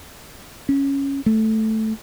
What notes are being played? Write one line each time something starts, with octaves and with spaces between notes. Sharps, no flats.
C#4
A3